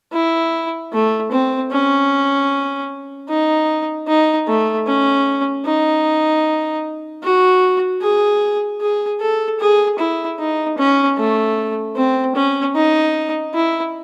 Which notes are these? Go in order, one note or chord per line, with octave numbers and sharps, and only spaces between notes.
E4
A3
C4
C#4
D#4
D#4
A3
C#4
D#4
F#4
G#4
G#4
A4
G#4
E4
D#4
C#4
A3
C4
C#4
D#4
E4